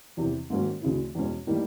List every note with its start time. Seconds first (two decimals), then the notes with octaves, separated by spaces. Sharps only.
0.17 E2 C3 E3
0.50 G#2 D#3 F#3 A#3 C#4
0.82 D2 C#3 E3
1.15 E2 B2 G#3 C#4
1.47 A2 E3 G3 A#3 D#4